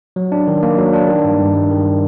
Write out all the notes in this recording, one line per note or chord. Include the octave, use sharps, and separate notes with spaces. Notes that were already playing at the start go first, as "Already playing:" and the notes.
F#3
D4
D#3
A#3
F#3
D4
D#3
G2
G2
G3
D#3